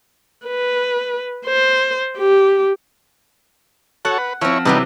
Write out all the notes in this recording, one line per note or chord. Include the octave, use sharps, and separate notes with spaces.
B4
C5
G4
F#4 A4 C#5 F#5
B4
F3 C4 E4 C#5
C3 E3 F#3 G3 B3 D#4